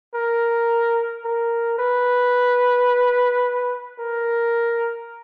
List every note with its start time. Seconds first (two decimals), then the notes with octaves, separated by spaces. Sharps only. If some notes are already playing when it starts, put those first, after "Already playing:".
0.15 A#4
1.25 A#4
1.79 B4
3.99 A#4